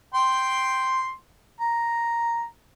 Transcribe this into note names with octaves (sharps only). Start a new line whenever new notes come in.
G5 C6
A#5